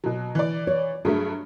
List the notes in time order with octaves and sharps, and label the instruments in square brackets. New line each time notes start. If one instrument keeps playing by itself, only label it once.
[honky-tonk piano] B2 F#3
E3 D5
[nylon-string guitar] C#5
[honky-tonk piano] G2 F#3 A3 [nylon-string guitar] G#4 E5